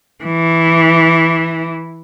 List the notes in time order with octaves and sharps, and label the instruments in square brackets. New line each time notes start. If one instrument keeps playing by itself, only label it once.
[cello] E3